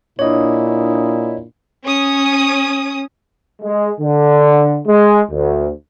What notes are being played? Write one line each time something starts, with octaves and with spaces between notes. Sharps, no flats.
A#2 D4 E4 C#5 D#5 D#6
C#4 D#6
G#3
D3
G#3
D2